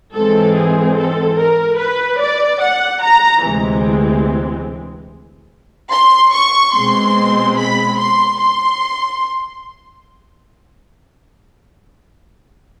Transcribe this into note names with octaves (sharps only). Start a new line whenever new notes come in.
G#2 E3 G#3 C4 A4
G#4
A4
A#4
B4
D5
F#5
A#5
D2 C3 E3 G#3 C4
C6
C#6
B2 G#3 C4 C6
B5
C6
C6